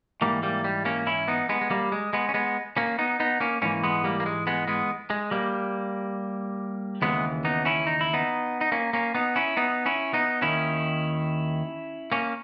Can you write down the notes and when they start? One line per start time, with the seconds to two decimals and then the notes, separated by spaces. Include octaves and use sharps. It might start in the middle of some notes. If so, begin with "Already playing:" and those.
0.22 G#2 E3 G3 A#3
0.43 G3 A#3
0.64 G3
0.85 A#3 C#4
1.07 C#4 E4
1.28 B3 D#4
1.49 G#3 B3
1.61 G#3
1.70 G3 A#3
1.92 G#3
2.13 G#3 B3
2.29 C#4
2.34 G#3 B3
2.77 A#3 C#4
2.98 B3 D#4
3.20 B3 D#4
3.40 A#3 C#4
3.62 G#2 E3 A#3 C#4
3.84 G#3 B3
4.04 G3 A#3
4.20 A#3
4.26 G#3
4.47 G#3 B3
4.68 G#3 B3
5.10 G#3
5.31 G3 A#3
7.02 D#2 C#3 E3 G#3 B3
7.45 B3 D#4
7.65 C#4 E4
7.87 D#4
8.01 E4
8.13 B3 D#4
8.61 D#4
8.72 A#3 C#4
8.93 A#3 C#4
9.15 B3 D#4
9.36 C#4 E4
9.57 B3 D#4
9.86 C#4 E4
10.13 B3 D#4
10.42 D#2 D#3 C#4 E4
12.12 A#3 C#4